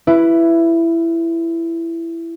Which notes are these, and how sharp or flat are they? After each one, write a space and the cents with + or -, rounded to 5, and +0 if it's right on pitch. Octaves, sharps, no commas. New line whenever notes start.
E4 +15 B4 +0